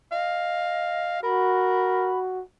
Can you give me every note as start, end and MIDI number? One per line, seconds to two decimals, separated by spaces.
0.12 1.18 75
0.12 1.21 77
1.23 2.43 66
1.23 2.11 70
1.23 2.19 83